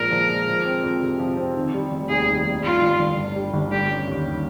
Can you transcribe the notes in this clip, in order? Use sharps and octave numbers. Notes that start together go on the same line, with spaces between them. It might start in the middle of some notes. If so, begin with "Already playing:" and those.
Already playing: A#1 A#2 F3 G#3 A#4
F3
G#3
F3
C4
F2
C3
F3
C4
D#3
G3
F1
D#2 G#4
D#3
G3
G3 F4
G1
G1
G2
G3
G1
G3 G4
C#4
D#2
D#3